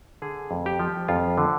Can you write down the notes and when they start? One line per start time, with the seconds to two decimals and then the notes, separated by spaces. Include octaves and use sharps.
0.22 D3 G#4
0.51 F2
0.66 G4
0.79 F3
1.08 F2 F4
1.38 D3